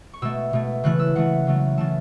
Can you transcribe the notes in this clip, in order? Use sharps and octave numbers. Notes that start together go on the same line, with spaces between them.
C#6
B2 A3 E6
B2 A3
C#3 E3 A3 F#6
E6
C#3 E3 A3 F#5
C#3 F#3 A3
C#3 E3 A3 A5